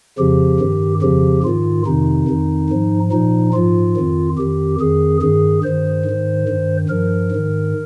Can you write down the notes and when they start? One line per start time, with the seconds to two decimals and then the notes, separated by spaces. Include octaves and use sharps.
0.18 F2 C#3 F3 G4
0.60 G2 D#3
1.02 F2 C#3 F3 G4
1.44 G#2 D#3 F4
1.86 F2 C3 D#3 D#4
2.28 F2 D#3
2.70 G#2 F3
3.12 A#2 F3 D#4
3.54 G#2 F3 F4
3.96 F2 D#3
4.38 F2 D#3 G4
4.80 F2 D#3 G#4
5.21 G2 D#3 G#4
5.64 G2 D#3 C5
6.05 G#2 D#3
6.48 G2 D#3
6.89 G2 F3 A#4
7.32 G#2 D#3